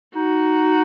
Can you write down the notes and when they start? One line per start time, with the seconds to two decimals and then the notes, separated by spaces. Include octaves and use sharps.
0.16 D#4 F#4